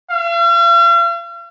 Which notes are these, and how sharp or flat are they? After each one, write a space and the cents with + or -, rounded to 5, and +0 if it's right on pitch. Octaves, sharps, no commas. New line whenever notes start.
F5 -45